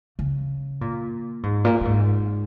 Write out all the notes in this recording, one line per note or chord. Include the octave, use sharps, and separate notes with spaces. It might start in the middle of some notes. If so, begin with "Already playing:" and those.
C#3
A#2
G#2
A#2
A#2
G#2